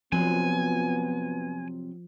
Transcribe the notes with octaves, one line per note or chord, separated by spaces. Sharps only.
C3 F3 F#3 B3 G#5